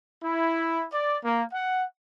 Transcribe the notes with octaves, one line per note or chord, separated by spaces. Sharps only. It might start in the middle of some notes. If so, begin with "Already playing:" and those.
E4
D5
A#3
F#5